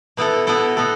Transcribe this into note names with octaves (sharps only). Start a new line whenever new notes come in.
B2 B3 E4 A4
B2 B3 E4 A4
B2 B3 A4